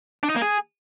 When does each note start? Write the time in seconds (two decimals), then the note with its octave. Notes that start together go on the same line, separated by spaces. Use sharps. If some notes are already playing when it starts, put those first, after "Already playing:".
0.23 D4
0.29 D#4
0.36 A#3
0.42 G#4